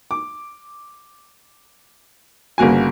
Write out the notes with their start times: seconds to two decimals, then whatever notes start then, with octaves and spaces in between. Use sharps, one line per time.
0.11 D6
2.58 G1 C#3 A#3 F#4 G#5